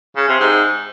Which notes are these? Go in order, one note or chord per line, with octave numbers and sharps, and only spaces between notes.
C#3
C3
G#2